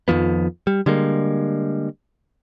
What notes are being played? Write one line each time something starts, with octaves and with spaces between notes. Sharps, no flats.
F2 D#3 F3 B3
G3
D3 G3 G#3 A#3